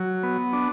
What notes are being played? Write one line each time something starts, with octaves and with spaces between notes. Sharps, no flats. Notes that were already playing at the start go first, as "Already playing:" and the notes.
Already playing: F#3
B3
D4